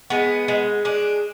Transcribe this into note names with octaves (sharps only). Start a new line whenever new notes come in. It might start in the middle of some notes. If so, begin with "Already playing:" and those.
G#3 B3
G#3
G#3 D4